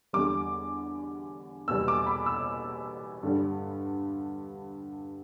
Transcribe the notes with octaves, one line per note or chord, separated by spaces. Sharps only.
E2 D3 G3 D6
E2 B2 G3 E6
D6
B5
E6
G2 D3 G3